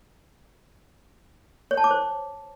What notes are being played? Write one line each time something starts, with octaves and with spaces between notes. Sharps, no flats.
C#5
A5
D6
C5